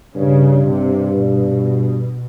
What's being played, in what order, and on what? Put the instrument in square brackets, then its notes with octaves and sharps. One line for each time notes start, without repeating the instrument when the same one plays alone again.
[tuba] G2 [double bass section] C#3
[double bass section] C3
B2